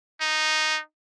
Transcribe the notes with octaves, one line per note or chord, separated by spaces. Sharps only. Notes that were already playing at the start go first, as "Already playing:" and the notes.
D#4